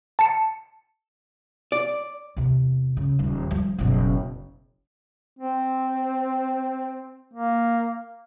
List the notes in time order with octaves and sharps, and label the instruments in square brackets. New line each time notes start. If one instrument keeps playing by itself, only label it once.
[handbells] A5 C#7
[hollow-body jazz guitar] D5
[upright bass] E2 C3
C#3
D#1
F3 G3
F#1 B2
[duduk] C4
A#3